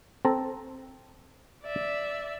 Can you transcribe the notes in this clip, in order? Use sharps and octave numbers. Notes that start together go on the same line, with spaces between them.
C4 A4 A#5
D5 E5